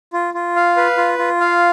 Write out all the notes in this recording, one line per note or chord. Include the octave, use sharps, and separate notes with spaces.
F4
F4
F5
B4
F4
F4
F5